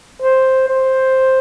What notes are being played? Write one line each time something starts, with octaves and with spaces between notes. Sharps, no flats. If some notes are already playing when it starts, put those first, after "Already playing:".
C5
C5